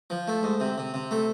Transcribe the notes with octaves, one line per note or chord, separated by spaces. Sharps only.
F3
A3
G#2
C3
C3
C3
A3